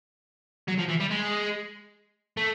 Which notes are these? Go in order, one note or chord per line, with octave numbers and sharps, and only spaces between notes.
F#3
F3
E3
G3
G#3
A3